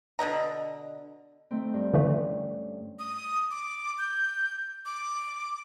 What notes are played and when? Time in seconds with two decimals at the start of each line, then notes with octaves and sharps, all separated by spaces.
0.19 B2 D3 D#5 A#5
1.51 D#3 A3 C4
1.74 G2
1.93 D3 E3 A3 C#4
2.99 D#6
3.51 D6
3.98 G6
4.85 D6